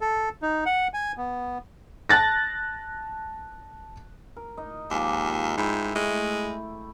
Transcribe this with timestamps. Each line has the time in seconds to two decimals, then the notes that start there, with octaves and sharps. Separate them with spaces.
0.01 A4
0.42 D#4
0.66 F#5
0.94 G#5
1.17 B3
2.09 A5 F#6 A6 A#6
4.36 A#4
4.57 D#4 D#5
4.90 D#2 F3 G#3 D6
5.57 G#2 E4 G5
5.95 G#3 A3